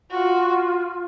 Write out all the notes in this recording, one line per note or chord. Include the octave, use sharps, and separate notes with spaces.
F4 F#4